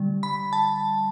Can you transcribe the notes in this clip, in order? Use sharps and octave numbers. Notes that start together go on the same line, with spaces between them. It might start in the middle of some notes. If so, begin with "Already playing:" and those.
Already playing: D3 G3
B5
A5